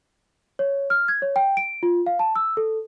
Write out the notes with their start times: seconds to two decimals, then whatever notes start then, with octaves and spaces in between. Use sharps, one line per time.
0.59 C#5
0.90 F6
1.08 G#6
1.22 C#5
1.36 G5
1.57 D7
1.83 F4
2.06 F5
2.19 A5
2.36 E6
2.57 A4